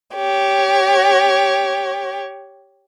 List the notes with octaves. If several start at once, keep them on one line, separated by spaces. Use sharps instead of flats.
G4 C#5